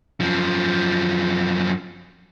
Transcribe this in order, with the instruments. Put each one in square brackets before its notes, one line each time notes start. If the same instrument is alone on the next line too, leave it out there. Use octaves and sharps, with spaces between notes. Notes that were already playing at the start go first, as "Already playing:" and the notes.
[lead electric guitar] F#2 F3